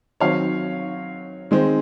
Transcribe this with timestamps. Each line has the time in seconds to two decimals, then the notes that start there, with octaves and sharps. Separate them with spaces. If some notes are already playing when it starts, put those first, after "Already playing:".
0.20 D#3 F#3 C4 C#5 F5
1.51 D#3 G#3 C4